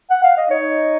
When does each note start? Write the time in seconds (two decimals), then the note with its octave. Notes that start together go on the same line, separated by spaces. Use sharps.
0.10 F#5
0.23 F5
0.37 D#5
0.50 D#4 C#5